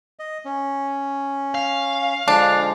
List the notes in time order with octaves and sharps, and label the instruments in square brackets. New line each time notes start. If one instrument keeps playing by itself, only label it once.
[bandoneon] D#5
C#4
[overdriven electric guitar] F5
[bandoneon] D3 F3 G#3 [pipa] D4